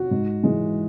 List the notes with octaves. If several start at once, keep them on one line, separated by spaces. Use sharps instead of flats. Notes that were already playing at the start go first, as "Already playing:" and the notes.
Already playing: F#4
G#2
E3 G#3